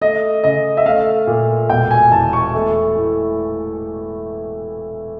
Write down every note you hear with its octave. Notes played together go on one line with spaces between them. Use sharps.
A3 D#5
C#3 D#5
E5
A3 F5
A#2
E1 G5
G#5
E2 A5
C#6
A3
A2